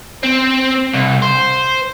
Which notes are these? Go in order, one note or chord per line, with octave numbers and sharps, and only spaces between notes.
C4
C2
C5